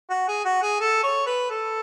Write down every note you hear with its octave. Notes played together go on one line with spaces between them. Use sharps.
F#4
G#4
F#4
G#4
A4
C#5
B4
A4